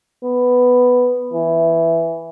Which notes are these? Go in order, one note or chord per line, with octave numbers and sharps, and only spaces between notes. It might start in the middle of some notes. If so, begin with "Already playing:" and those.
B3
E3